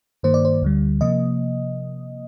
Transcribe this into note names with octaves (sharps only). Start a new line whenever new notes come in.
G2 D#3 A#3 C5
D5
C5
D2 D3 G3
C3 F3 A#3 D#5